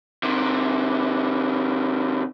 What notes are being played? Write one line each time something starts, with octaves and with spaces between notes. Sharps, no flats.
C3 D#3